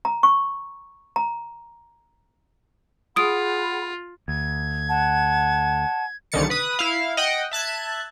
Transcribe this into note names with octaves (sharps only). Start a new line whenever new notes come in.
A#5
C#6
A#5
F4 G#4 F#5 B5 D#6 D7
D2 G#6
F#5 A5
C2 D3 D#3 A6 C#7
B4 D#6
E4 F5
D#5 F#5 G5
E5 A5 F#6 G#6